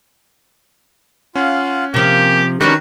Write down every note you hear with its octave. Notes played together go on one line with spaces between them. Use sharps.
C#4 F4 F5 F#5
C3 F3 A#3 G4
D#3 C#4 D4 F#4 G4 B4 A#5 C#6